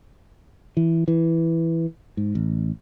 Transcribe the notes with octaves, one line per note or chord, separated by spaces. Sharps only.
E3
E3
G#2
A1